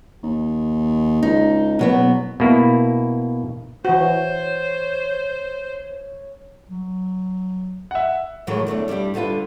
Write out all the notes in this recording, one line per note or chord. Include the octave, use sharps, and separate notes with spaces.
D#2
C#2 D#4
F#1 B2 F#3 B3
B2 A#3 E4
E3 F#4 C5 C#5
F#3
E5 F#5
F#2 A2 D#3 E3 F#3 G#3
F#2 B2 D3 A3
G2 G3 D4 E4 G4
D2 D3 G3 F4 B4